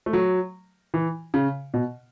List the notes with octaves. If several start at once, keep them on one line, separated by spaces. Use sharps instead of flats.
A3
F#3
E3
C#3
B2